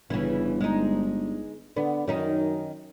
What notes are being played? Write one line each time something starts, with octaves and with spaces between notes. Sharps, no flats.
G1 C#3 E3
G#3 D#4
D3 B3
F#2 D#3 C#4 D#4